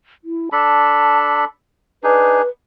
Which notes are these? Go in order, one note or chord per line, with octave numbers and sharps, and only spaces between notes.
E4
D4 A4 A5 B5
D4 D#4 G#4 B4